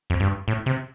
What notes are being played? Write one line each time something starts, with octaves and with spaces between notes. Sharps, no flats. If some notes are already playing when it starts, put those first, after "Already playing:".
F2
G2
A2
C3